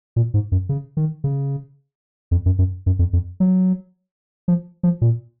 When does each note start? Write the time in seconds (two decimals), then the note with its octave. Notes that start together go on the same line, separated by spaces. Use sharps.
0.16 A#2
0.34 G#2
0.52 F#2
0.69 C#3
0.97 D#3
1.24 C#3
2.31 F2
2.46 F#2
2.59 F#2
2.86 F#2
2.99 F2
3.13 F2
3.40 F#3
4.48 F3
4.83 F3
5.01 A#2